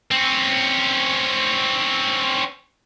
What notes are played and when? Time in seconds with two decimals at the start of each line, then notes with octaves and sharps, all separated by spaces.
0.11 C4 C#4